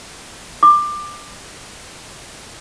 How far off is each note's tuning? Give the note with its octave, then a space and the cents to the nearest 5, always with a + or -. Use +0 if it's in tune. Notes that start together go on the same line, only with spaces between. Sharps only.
D6 +20